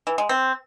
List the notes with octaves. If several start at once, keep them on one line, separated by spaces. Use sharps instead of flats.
E3
G#3
C4